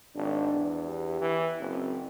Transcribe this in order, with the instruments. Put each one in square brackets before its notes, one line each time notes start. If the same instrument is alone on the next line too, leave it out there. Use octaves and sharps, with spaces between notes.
[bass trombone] G#1 [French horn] D4
[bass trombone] E2
[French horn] G4
[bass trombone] E3
[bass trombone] F#1 [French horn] C4